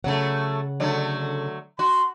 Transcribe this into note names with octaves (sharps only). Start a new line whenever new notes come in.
C#3 F#3 A3 F#5
D3 F#3 A3
F#4 C6